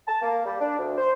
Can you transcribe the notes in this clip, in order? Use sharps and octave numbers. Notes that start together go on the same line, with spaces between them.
A5
A#3
G3
D4
D2
C5